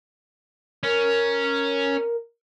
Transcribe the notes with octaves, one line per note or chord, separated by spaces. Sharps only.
C#4 A#4